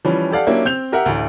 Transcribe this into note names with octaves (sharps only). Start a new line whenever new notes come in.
E3 F3 G3 C#4
G4 A4 D5 F5 F#5
F#3 A#3 C#4 D4 E4 G4
C4 G6 F7
G4 A#4 E5 F#5
A1 D2